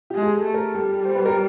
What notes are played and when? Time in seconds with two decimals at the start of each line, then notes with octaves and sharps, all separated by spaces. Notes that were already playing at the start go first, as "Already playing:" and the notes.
0.10 G#3 G4
0.22 G#4
0.34 A4
0.45 A3
0.54 A#4
0.74 G3 A4
1.05 C5
1.15 B4
1.25 A#4